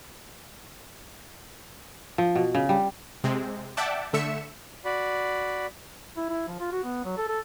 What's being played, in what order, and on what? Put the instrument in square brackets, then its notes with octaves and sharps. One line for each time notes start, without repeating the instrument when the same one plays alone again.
[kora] F3
B2
C#3
G3
[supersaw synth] C3 G#3 C4
D5 E5 F#5 G5 A5 D6
D3 A3 E5 C#7 E7
[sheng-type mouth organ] F#4 D5 B5
[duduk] E4
E4
F3
F4
F#4
B3
F#3
A4
A4